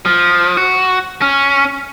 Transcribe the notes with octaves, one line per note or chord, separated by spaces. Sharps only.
F3
F#4
C#4